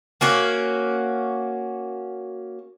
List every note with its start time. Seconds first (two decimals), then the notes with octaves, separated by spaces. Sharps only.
0.21 A#3 C#4 F#4